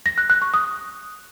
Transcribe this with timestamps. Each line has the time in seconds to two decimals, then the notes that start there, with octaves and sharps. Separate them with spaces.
0.06 A#6
0.18 F#6
0.30 F#6
0.42 C#6
0.54 D#6